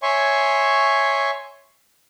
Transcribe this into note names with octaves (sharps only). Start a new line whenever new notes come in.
C#5 E5 G#5 C6 C#6